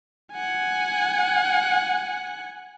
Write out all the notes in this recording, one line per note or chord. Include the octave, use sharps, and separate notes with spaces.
F#5 G#5